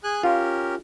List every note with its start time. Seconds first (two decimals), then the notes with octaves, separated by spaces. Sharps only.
0.04 G#4 G#5 F#6
0.23 C#4 F4 G4 A#4